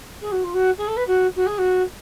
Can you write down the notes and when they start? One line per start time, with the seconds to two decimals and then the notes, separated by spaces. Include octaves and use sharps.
0.21 G#4
0.32 F#4
0.44 F4
0.54 F#4
0.78 G#4
0.88 A4
0.97 B4
1.07 F#4
1.36 F#4
1.46 G#4
1.58 F#4